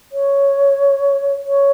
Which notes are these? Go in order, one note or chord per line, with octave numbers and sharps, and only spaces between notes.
C#5
C#5